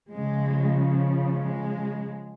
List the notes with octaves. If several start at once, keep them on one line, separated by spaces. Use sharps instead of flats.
C#3 F3 G#3
G#3